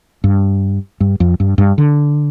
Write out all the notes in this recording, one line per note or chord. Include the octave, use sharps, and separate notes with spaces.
G2
G2
F2
G2
G2
D3